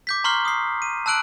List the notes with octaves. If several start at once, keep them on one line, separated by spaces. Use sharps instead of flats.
D6 G6 B6
A#5 C6 C#6 F6 C7
D#6 C7
D#7
A5 E6 F#6 D7 F#7